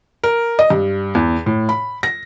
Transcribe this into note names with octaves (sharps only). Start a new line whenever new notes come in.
A#4
D#5
G2
E2
A2
B5
A#6